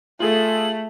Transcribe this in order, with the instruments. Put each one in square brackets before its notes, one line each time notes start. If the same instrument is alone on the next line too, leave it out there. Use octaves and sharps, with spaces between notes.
[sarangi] A3 [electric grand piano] F4 G#4 A4 [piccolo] F#7